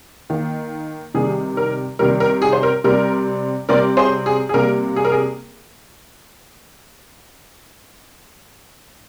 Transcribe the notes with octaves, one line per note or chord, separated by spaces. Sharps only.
D#3 A#3
C3 D#3 G3 G#4
A#4
C3 D#3 G3 A#4
A#4
G#4
C5
A#4
C3 G3 C4 A#4
C3 G3 C4 A#4 D5
G#4 C5
G#4
G#4
C3 G3 A#3 A#4
G#4
A#4
G#4